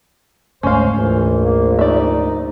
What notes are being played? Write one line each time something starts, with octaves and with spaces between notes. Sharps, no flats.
D2 G#2 C#4 C5 F5
A#1 E3
A#3
D#4 D5 E5